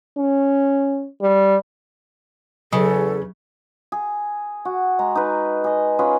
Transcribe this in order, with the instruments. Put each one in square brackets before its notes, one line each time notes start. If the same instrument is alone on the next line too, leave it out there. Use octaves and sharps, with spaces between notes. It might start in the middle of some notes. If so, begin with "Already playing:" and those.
[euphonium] C#4
G3
[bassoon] E2 [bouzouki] C#3 [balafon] F#3 [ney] A4
[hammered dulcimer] G#4
F#4
G#3 A#5
D#4 B4
G#4 D#5
C#4 F4 G#4 B4